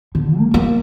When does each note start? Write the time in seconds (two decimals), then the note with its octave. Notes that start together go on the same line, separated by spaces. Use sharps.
0.15 D3
0.38 A#3
0.54 A#3